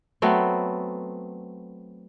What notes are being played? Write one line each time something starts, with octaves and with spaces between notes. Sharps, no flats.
F#3 A3 B3 C4